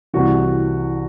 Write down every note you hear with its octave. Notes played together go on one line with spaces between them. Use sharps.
C2 C3 E3 F#4